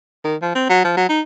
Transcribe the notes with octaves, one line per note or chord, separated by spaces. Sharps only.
D#3
F3
C4
F#3
F3
F#3
D#4